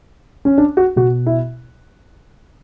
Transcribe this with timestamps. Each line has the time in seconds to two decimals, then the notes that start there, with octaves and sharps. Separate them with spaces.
0.45 C#4
0.58 D4
0.77 F#4
0.96 B2 F#4
1.26 E4